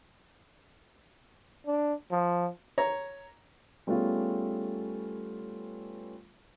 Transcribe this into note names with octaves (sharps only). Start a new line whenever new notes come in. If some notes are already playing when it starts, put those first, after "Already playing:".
D4
F3
C#5 A#5
G3 A3 B3 C#4 F4 G#4